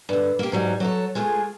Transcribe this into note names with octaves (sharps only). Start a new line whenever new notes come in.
G2 D3
A#3 G4
G#2 F#3 G3
F#3 A4 C#5
G#3 A3 F4 G#4